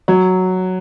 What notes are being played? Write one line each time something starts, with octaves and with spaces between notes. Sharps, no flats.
F#3